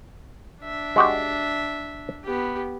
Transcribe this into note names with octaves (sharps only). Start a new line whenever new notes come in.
D4 E5
G#3 F#4 G4
B3 G4